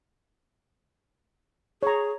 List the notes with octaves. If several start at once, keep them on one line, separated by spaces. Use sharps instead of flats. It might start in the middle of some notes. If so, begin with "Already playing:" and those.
G#4 C#5 A#5